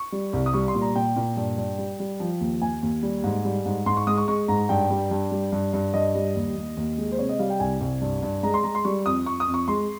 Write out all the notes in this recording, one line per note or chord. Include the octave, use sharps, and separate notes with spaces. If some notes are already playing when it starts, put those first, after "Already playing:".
Already playing: C#6
G3
C2
D#6
G3 C#6
C6
A#2
A#5
A#2 G5
A#2
G2
G2
G3
G3
F3
D#2
D#2 G#5
D#2
G3
G#2
G3
G#2
G#2 C6
C#6
G#3 D#6
C#6
G#3 C#6
G#2 A#5
G2 G5
G3
G2
G3
G2
G2
G2 D#5
G3
D#2
D#2
D#2
G#3
C5
C3 C#5
D#5
G3 F5
G5
C2 G#5
C2
G2
G2
G#3 A#5
C6
G#3 A#5
C6
G3 C#6
F2 D#6
F2 C#6
D#6
F2
C#6
G#3 C6